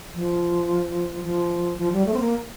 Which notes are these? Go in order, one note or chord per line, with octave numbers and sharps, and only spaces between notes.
F3
F3
F3
G3
A3
C4
A#3